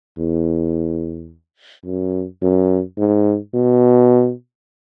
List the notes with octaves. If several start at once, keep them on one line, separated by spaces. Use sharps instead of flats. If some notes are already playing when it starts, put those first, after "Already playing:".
E2
F#2
F#2
G#2
B2